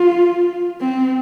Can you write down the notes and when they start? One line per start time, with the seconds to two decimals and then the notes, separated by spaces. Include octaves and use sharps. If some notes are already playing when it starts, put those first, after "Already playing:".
Already playing: F4
0.81 C4